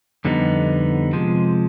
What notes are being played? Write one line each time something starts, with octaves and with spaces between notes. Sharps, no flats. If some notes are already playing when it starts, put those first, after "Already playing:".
F2 D3 G3 B3 D#4
C3 F3 G#3